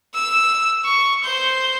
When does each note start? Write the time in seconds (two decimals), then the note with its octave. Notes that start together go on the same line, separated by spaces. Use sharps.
0.15 E6
0.85 C#6
1.24 C5 G6